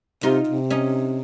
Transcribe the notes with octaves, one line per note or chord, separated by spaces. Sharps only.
C3 D#4 F4
C3
C#4 D#4